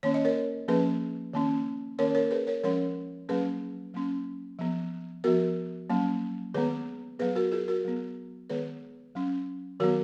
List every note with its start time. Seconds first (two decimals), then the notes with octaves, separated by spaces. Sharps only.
0.03 D#3 A#3 C#4 C#5
0.14 D#5
0.25 A#4 C#5
0.68 F3 A#3 C#4 G#4 B4
1.33 D#3 A#3 C#4
1.99 D#3 A#3 C#4 A#4 C#5
2.15 A#4 C#5
2.31 G#4 B4
2.47 A#4 C#5
2.64 F3 G#3 C#4 A#4 C#5
3.29 F#3 A#3 C#4 G#4 B4
3.94 F#3 A#3 C#4
4.59 F3 B3
5.24 F3 B3 F#4 A#4
5.90 F#3 A#3 C#4
6.54 D#3 G#3 B3 G#4 B4
7.19 F#3 B3 G#4 B4
7.36 F#4 A#4
7.52 F4 G#4
7.68 F#4 A#4
7.85 F#3 B3
8.50 D#3 G#3 B3 G#4 B4
9.15 F#3 C#4
9.80 D#3 F#3 B3 F#4 A#4